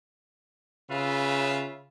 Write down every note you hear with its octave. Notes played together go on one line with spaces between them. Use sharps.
C#3 F4 B4 E5